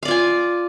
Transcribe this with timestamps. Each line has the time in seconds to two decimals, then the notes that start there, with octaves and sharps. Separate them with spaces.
0.03 F5
0.05 D5
0.08 F4
0.11 G#5